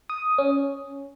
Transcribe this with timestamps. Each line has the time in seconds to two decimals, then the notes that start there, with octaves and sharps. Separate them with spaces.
0.10 D#6
0.38 C#4